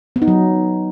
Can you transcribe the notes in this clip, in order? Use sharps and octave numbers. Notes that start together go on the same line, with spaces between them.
B3
D#4
F#3